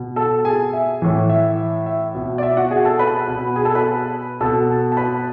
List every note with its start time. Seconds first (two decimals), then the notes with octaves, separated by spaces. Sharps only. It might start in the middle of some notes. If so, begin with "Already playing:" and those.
Already playing: B2
0.16 A4 A5
0.45 G#4 G#5
0.73 E5
1.02 A2 E3
1.30 E5
1.86 E5
2.15 B2
2.38 D5
2.43 E5
2.57 F#4 F#5
2.71 G#4 G#5
2.85 A4 A5
2.99 B4 B5
3.28 B2
3.56 G#4 G#5
3.65 A4 A5
3.75 B4 B5
4.41 B2 A4 A5
4.92 A5
4.97 B4 B5